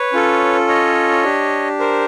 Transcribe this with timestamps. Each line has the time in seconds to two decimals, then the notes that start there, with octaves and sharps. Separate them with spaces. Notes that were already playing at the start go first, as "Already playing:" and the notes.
Already playing: B4 C#5
0.13 C#4 F4 A4
0.68 C#5 D#5
1.24 D4 G4
1.79 A#4 C5